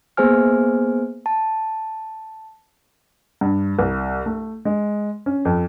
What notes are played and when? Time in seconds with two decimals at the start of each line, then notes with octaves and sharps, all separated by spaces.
0.17 A#3 B3 G#4 C5 G#5 F6
1.26 A5
3.41 G2
3.79 C2
4.26 A3
4.65 G#3
5.26 C#4
5.45 F2